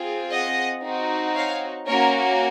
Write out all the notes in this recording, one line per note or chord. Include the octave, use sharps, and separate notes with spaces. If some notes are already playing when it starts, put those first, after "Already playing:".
Already playing: C4 F4 G#4
D#5 F#5
C4 D#4 F#4
C#5 F5
A#3 C#4 F#4 A#4 C#5